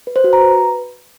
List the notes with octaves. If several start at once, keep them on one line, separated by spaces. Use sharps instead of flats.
B4
C5
F#4
A#5
B4